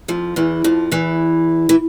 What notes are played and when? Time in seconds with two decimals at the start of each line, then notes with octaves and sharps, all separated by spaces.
0.08 F2 F3
0.36 E2 E3
0.64 F2 F3
0.91 E2 E3
1.69 E3